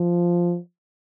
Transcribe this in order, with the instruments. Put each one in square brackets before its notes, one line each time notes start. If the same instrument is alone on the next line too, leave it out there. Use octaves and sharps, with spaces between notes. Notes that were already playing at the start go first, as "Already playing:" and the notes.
Already playing: [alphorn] F3